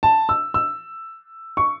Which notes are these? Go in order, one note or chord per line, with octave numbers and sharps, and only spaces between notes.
A5
E6
E6
C#6